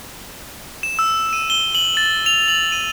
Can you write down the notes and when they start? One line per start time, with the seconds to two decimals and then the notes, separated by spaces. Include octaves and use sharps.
0.83 E7
0.99 E6
1.33 D#7
1.50 G7
1.75 F#7
1.97 A6
2.26 F7
2.48 F#7
2.72 D#7